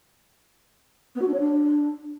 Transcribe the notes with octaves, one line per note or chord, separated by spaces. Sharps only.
B3
F#4
D4
C#5
D4